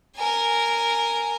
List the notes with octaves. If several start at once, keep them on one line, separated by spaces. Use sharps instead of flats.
A#4 G#5